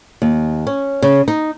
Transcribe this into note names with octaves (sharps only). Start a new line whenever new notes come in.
D#2
C#4
C#3
D#4